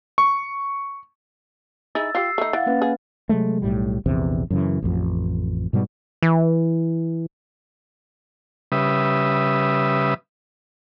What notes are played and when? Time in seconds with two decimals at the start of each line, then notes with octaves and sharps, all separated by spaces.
0.18 C#6
1.95 D#4 E4 G#4 E6 A6
2.15 F4 G4 E6 C7
2.38 A3 D#4
2.53 E3 F5 F#5 A6
2.66 A#3 C#4 B4
2.82 G#4
3.29 C3 F#3 G#3 A3
3.62 B1 A2 G3
4.06 A#1 E2 C3
4.50 F#2 C#3 E3
4.82 A1 F2
5.73 G#2 B2 G3 B3
6.22 E3
8.72 C#3 G3 B4 E5 D#6